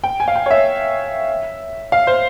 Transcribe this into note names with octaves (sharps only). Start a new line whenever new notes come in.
G5
G#5
F5
G5
C#5
E5
F5
C5